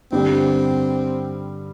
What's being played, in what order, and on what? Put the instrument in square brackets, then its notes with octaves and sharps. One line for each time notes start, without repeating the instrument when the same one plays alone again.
[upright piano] G2 D3 G3 [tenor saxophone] C4